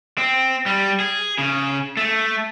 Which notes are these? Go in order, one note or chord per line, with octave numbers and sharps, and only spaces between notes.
C4
G3
G#4
C#3
A3